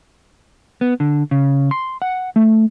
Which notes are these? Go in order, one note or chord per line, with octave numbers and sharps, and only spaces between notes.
B3
D3
C#3
C6
F#5
A3